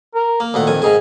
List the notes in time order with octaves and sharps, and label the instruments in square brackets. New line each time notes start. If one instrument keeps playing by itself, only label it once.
[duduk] A#4
[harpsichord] A#3
[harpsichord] D2 A#2 F#5 [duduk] D#3
[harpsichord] F2 G#5
[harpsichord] G#2 D#3 G#5 [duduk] G#4